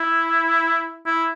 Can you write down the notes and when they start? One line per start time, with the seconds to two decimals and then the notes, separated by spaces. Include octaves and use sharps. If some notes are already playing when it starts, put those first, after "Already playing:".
Already playing: E4
1.06 E4